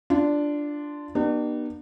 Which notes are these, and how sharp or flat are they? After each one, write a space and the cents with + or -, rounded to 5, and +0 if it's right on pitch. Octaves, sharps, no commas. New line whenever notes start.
D4 +0 F4 -15
B3 -45 D4 +45 G4 -30